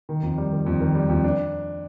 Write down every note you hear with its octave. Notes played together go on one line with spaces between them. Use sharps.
D#3
F2
G3
D#3
F2
D#3
G3
F2
D4